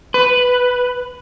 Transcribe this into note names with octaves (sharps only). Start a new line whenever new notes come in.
B4